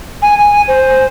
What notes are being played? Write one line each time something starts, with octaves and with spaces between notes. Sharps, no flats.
G#5
G#5
C5